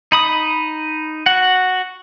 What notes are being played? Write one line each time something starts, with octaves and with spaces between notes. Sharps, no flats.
D#4 B5 D#6
F#4 F#5